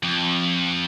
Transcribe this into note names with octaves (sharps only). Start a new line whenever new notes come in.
F2